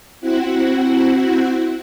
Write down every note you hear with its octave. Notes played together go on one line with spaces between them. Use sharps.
C4 E4 F#4 F#5